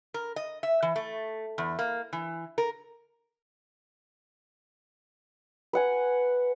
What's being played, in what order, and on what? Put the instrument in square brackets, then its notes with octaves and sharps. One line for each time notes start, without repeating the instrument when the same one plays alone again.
[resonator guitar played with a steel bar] A#4
D#5
E5
E3
A3
E2
A#3
E3
A#4
[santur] B4 F#5 G#5